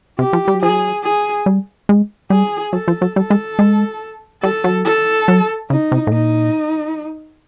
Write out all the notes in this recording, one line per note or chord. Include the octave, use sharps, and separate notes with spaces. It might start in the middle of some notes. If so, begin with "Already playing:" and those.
C3 G4
F3
G3
F#3
F3 G#4
F#3
G#4
G3
G#3
G3 G#4
F#3 A4
F3
F#3
G3 A4
G#3
G#3
G3 A4
F#3
A4
F#3
C#3 D#4
C3
A2
A#2 D#4